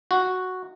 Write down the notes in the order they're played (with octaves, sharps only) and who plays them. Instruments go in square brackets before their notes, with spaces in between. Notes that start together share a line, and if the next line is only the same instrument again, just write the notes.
[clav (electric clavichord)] F#4